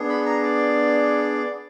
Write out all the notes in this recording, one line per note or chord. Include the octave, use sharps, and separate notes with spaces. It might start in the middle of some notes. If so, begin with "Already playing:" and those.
Already playing: B3 D4 G#4
B5
A#5
D5